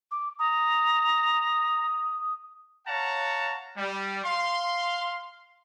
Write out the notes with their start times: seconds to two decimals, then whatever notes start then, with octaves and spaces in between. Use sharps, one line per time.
0.11 D6
0.39 A#5 D#6
2.87 C#5 F5 F#5 A5 A#5
3.77 G3
4.24 F5 C6